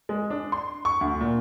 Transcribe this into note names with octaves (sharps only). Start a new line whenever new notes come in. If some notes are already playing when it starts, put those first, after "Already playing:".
G#3
D4
C6
C#6
D2
A#2